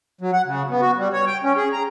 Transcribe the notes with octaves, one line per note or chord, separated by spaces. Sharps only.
F#3
F#5
C#3
B3
F#4
G3
C#5
G5
C#4
G#4
A#5